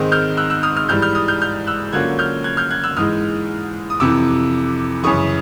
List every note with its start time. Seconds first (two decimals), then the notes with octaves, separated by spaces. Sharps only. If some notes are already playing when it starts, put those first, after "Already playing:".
Already playing: G#2 D#3 G#3 C4 D#4
0.12 F6 G6
0.37 E6 F#6
0.50 E6 F#6
0.63 D#6 F6
0.76 D#6 F6
0.89 G#2 E3 G3 F6 G6
1.02 F6 G6
1.15 D#6 F6
1.28 F6 G6
1.42 F6 G6
1.67 E6 F#6
1.93 D3 F#3 A#3 C#4 F4 F#6 G#6
2.19 F6 G6
2.44 F#6 G#6
2.57 F6 G6
2.71 F#6 G#6
2.84 E6 F#6
2.97 G#2 E3 G#3 D#6 F6
3.90 D#6
4.00 F2 C3 E3 D6 E6
5.03 F#2 C#3 E3 C#6 D#6